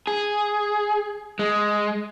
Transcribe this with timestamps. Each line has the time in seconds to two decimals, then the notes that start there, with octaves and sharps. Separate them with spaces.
0.07 G#4
1.39 G#3